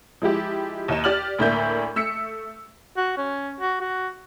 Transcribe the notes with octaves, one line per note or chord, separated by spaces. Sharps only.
F3 G#3 E4 G4
D#2 D#4 E7
G4 D5 F6 F#7
D2 A2 A#3 D4 E5 G6
A3 E6 B6 C#7
F#4
C#4
F#4
F#4